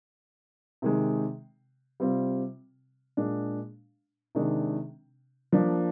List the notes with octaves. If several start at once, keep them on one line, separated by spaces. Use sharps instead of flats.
C3 D#3 G#3
C3 G3 C4 F4
A#2 G#3 D4
C3 D#3 G#3 D4
F3 A#3 D4